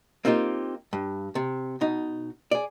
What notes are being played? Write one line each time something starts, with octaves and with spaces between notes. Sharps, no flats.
A#3 C4 D#4 F4 G4
G2
C3
B2 D#4
G#4 D5